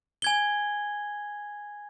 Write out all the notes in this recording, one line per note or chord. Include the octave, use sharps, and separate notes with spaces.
G#5 G#6 G7